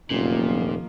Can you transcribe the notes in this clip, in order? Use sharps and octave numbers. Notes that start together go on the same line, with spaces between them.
F1 F#2 A#2 D#3 F3 A#3